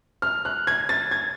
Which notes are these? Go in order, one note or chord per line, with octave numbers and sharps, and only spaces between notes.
F6
F#6
G#6
A6
G#6